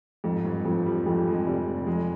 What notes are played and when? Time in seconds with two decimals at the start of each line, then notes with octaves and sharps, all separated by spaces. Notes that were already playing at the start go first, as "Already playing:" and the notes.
0.24 F2 G#2
0.45 G2
0.65 F2 F3
0.86 G3
1.06 F2 G#3
1.16 G3
1.27 G#3
1.46 F1 G3
1.87 F2 G#3